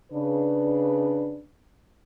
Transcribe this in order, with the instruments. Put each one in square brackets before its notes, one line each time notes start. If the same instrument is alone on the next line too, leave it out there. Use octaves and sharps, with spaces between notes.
[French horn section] C#3 D4 B4